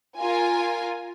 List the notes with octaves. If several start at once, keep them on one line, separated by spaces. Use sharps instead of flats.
F4 A#4 G#5